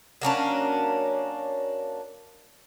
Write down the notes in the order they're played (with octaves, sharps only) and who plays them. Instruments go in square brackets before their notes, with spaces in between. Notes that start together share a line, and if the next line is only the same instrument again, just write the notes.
[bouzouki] F#3 A#3 C#4 D4